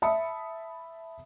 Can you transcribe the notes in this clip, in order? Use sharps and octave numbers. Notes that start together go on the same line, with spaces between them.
E5 A5 B5 D#6 C#7